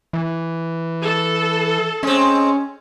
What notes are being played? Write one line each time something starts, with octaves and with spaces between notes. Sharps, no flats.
E3
A4
G#3 C4 C#4